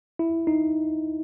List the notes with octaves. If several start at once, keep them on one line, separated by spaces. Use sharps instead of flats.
E4
D#4